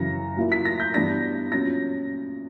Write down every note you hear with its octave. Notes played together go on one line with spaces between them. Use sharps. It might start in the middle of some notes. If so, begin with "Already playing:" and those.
Already playing: F#2 C#3 E3 A#6
A#2 F#3 A#3 E4
B6
A#6
G6
G2 E3 B3 D4 A#6
A#2 F#3 C#4 A#6